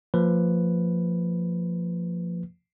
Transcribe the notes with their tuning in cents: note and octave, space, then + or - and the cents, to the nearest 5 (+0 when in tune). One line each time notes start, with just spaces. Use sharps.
F3 +0 A#3 -40 B4 +0